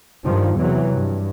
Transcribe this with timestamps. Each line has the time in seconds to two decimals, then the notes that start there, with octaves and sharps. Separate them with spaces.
0.25 G2 D#3 F3
0.58 E2 C3 E3 F#3
0.92 G2